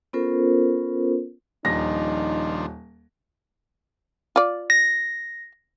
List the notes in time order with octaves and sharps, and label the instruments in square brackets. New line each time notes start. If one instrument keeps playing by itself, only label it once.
[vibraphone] B3 C#4 F4 A4 A#4 C5
[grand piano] D#1 A#6 [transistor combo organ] D#3 F3 D4 [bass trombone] D#4
[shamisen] F4 D5
[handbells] A#6